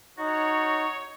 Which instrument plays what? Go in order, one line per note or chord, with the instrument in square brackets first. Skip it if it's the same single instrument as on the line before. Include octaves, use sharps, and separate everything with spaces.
[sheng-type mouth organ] D#4 [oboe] F#4 [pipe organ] C#5